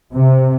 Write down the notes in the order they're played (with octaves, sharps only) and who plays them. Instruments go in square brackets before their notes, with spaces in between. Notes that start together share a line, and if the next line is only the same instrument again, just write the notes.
[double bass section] C3